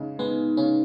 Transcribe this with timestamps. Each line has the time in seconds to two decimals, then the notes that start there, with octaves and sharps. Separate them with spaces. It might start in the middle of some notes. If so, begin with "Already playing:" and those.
Already playing: C#3 G#3 D#4
0.19 G#3 B3
0.57 C#3 C#4